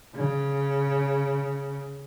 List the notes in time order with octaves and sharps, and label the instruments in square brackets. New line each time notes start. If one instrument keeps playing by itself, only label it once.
[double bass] C#3